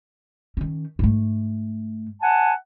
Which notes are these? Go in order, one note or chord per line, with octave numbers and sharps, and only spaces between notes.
D#3 C#4
G#2 A3
F#5 G#5 A5